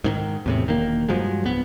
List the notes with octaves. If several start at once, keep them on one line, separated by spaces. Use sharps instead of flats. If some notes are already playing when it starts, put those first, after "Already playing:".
G#2 D3 D#3
E2 A2 C3
E1 D#3 A#3
G2 F3 F#3 G#3
D1 B3